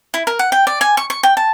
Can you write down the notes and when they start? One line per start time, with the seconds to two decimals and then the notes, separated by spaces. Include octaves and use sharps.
0.14 E4
0.27 A#4
0.39 F#5
0.52 G5
0.67 D5
0.81 G#5
0.97 C#6
1.10 C#6
1.23 G5
1.37 A5